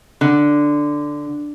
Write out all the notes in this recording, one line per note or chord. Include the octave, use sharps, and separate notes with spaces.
D3